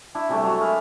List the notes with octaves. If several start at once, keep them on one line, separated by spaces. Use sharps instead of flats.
D4 E4 C#6
C3 E3 G3 A3
F#3 D4
G#3 E4 A#4